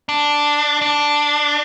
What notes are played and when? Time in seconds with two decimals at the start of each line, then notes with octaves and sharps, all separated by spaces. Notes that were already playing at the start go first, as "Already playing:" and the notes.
0.09 D4
0.82 D4